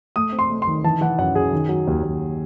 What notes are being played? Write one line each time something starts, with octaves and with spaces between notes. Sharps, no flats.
A3 D#6
C4
C6
A3
C6
D#3
E3 A5
E3 F#5
F#2 F#5
F#2 G#4
D#3
F#3
D#2
D#2